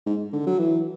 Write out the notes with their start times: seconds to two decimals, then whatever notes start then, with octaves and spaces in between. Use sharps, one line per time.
0.06 G#2
0.33 D3
0.46 F#3
0.59 E3